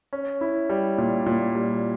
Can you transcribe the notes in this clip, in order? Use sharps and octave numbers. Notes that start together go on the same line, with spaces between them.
C#4
E4
G3
A#2
A#2
G3